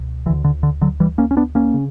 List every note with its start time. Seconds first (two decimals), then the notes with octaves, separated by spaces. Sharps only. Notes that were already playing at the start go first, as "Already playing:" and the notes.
Already playing: C#2 B2
0.26 D3 E3
0.30 D2
0.44 D3
0.63 D3
0.82 D3 F#3
1.00 E3 G3
1.18 A#3 C#4
1.31 C#4
1.37 B3 D4
1.55 A#3 C#4
1.74 C#3